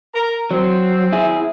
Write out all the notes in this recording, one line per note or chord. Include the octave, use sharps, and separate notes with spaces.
A#4 A#5
F#3 C4
E4 G#4